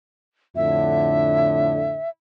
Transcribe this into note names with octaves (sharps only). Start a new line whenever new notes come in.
F2 A2 D3 E5